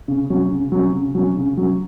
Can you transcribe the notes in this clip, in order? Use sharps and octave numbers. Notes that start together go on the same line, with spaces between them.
C#3
F#3 C#4
C#3
F#3 C#4
C#3
F#3 C#4
C#3
F#3 C#4